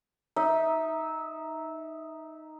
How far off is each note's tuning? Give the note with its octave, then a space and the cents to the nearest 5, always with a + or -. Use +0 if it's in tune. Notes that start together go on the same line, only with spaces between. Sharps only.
D#4 +0 E5 -20